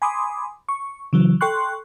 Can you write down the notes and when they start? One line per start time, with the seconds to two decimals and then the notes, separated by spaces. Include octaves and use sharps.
0.02 G#5 B5 C6 D6 D#6
0.69 C#6
1.13 C#3 E3 F#3
1.41 A4 G5 C6 C#6 F#6